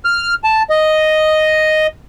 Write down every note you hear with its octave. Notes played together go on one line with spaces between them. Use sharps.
F6
A5
D#5